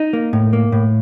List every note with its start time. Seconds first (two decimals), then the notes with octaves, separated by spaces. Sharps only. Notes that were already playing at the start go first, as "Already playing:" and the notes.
Already playing: D#4
0.13 A#3
0.33 A2
0.53 A#3
0.72 A2